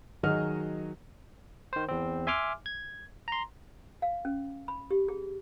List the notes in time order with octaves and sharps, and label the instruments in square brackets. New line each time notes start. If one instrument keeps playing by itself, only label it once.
[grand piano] D#3 F#3 F#4 G#4 D#5 F6
[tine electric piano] D#3 C5
E2 C4
E5 G#5 C6 D6 F6
G#6
A#5 C6
[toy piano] F5
C#4
B5
G4
G#4